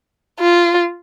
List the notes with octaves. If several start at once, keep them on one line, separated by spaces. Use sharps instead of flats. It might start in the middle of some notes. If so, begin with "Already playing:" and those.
F4